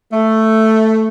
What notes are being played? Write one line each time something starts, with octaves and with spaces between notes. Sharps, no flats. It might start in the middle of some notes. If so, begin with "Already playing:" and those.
A3